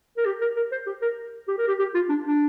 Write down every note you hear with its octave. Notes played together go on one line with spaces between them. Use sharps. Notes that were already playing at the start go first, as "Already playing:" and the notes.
A#4
G4
A#4
A#4
C5
G4
A#4
G4
A#4
G4
G4
F4
D4
D4